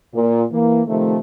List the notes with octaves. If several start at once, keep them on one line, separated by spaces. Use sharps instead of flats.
A#2
E3 A#3
C3 D#3 F3 A3